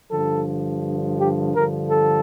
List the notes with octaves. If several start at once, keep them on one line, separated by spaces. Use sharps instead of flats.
G2 D3 F3 A4
G4
G2 D3 F3 A#4
A4